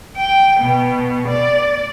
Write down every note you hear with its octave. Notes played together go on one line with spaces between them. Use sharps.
G5
B2
D5